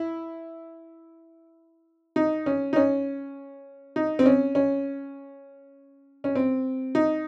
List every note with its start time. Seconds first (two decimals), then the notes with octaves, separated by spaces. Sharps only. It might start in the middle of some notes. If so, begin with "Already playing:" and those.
Already playing: E4
2.16 D#4
2.46 C#4
2.73 D#4
2.76 C#4
3.96 D#4
4.19 C4
4.26 C#4
4.55 C#4
6.24 C#4
6.35 C4
6.95 D#4